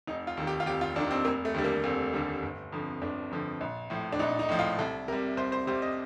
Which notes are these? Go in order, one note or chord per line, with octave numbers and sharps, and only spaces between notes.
F1 D#4
F4
D#2 D#3
G4
F4
F1 G4
F4
D#2 D#3 D4
C4
F1 A#3
A3
D#2 D3 G3
A#3
F1 C4
D#2 D3 G3
G1
F2 D3 F3
G1 D4
F2 D3 F3
A#1
A2 F3
D4
A#1 D#4
D#4
A2 F3
F4
C2 A4
C3 G3 A#4
C2 C5
C5
C3 G3 C5
D#5